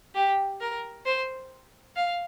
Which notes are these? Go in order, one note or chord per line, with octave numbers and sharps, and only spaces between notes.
G4
A#4
C5
F5